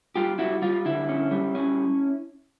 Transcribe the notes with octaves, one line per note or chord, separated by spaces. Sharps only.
G3 F4 G4
G3 E4 F#4
G3 F4
D3 E4
C#4
G3
C#4